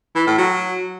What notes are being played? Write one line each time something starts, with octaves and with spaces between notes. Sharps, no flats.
E3
A2
F#3